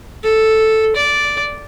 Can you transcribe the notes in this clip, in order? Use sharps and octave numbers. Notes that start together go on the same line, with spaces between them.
A4
D5